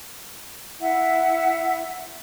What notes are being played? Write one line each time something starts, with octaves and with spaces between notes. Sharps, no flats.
E4 E5 F#5